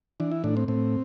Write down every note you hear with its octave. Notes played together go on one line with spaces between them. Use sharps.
E3 D4
E4
A2 D4
C4
A2 C4